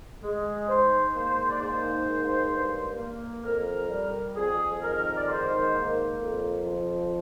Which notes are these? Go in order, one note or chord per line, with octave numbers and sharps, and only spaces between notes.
G#3
G#2 C5
A#3 C5
D5
G#2 C5
A#3
G2
A#3
F2 A#4
G3
F2 G#4
D#3 A#4
D5
G#2 C5
A#3
F2
F3